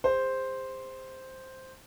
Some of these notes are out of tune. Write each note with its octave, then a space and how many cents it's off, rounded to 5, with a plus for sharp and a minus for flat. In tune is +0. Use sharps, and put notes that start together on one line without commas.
G#4 -45 C5 +0